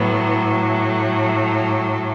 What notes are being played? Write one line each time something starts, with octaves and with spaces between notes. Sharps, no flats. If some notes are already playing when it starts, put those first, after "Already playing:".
Already playing: A2 F#3 B3
A3